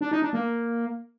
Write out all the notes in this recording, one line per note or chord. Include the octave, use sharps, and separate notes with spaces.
D4
D#4
D4
A#3